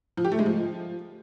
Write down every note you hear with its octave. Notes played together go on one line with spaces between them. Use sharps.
F3
G4
A3
G#3
F3